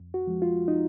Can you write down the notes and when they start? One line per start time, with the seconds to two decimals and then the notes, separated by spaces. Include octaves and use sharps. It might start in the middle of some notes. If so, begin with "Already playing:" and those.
Already playing: F2
0.14 F#4
0.27 F3 G#3
0.42 F4
0.68 D#4